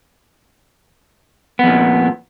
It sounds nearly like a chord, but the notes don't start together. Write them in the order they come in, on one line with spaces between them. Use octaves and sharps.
B3 F2 A#2